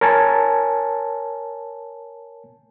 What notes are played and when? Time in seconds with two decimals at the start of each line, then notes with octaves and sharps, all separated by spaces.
0.01 A#4 C#5 G#5 A5